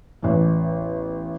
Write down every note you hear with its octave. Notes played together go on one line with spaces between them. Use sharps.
A1 E2